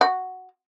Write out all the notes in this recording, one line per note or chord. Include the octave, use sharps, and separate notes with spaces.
F#4